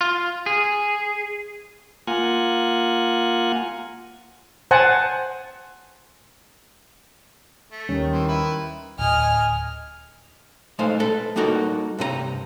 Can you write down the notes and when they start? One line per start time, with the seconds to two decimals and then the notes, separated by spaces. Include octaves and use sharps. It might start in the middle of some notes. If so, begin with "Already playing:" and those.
0.01 F4
0.46 G#4
2.07 A#3 F4 F#5 G#5
4.71 C5 F#5 G#5 A5
7.72 A3
7.89 D#2 D#3 G3 C#4
8.12 E3 C5
8.28 E4 B4
8.99 D1 D#5 G#5 F6
10.79 G#3 A3 D#4 C5 F5
11.00 A4 B4
11.36 G3 A#3 D#4 F#4 A4 A#4
11.98 G2 C3 B4 A#5